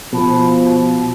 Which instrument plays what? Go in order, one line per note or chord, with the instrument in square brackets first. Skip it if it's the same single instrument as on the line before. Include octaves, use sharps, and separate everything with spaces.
[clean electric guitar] B2 [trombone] F3